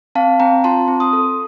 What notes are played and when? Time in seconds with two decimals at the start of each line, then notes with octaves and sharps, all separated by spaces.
0.15 C4 F5 A5
0.40 C4 G5 A#5
0.64 F4 A5 C6
0.88 C4
1.00 C6 D#6
1.13 A4